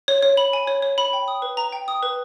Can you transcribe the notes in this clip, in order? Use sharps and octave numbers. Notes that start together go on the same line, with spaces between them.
C#5
C#5
B5
G#5
C#5
C#5
B5
G5
D#6
B4
A#5
G5
D#6
B4